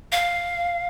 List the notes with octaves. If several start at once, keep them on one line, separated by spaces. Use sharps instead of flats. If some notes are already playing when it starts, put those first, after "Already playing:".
F5